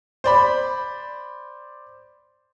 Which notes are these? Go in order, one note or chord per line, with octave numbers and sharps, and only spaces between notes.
C5 D5 B5